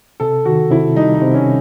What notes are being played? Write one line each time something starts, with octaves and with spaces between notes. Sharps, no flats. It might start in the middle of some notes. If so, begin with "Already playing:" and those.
C3 A4
D#3 F#4
C3 E4
G3 D#4
D#4
C3
C#4